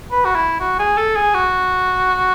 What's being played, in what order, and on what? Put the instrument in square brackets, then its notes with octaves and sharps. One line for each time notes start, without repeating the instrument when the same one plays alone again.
[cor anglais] B4
F#4
E4
F#4
G#4
A4
G#4
F#4